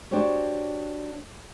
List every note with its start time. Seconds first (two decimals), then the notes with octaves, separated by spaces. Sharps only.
0.11 D4 F#4 G4 C5 C#5